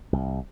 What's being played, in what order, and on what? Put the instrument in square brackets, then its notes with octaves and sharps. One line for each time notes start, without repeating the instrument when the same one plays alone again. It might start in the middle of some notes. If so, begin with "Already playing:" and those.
[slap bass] C2